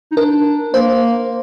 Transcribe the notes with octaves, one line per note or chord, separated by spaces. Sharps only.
D#4
D4 A#4
A#3 C5